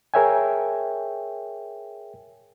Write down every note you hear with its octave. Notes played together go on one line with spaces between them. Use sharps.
G#4 A#4 C#5 E5 G5 G#5